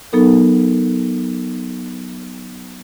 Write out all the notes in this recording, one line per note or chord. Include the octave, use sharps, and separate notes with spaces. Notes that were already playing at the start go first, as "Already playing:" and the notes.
F#3 B3 D#4 A4 A#4